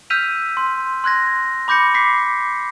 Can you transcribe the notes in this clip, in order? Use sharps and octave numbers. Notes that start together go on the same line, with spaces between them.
E6 F6 G6 B6 D#7 F7
C6
C6 F#6 G#6 A#6
B5 D6 G6 A#6 C#7
D6 B6 C7